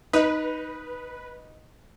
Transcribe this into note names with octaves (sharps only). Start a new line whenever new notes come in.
D#4 B4